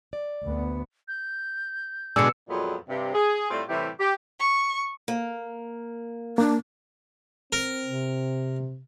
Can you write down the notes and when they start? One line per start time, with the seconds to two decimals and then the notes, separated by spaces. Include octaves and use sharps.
0.13 D5
0.45 D2 B3
1.08 G6
2.16 B2 D3 G#3 D4 E6 C#7
2.49 F2 A#2 F#3 G#3 B3
2.88 G2 C3
3.14 G#4
3.51 A2 G3 A3 C4 F4
3.69 A2 C3 E3 G3 G4
3.99 G4
4.39 C#6
5.08 A#3
6.38 A#3 D4
7.52 C4 A#4
7.85 C3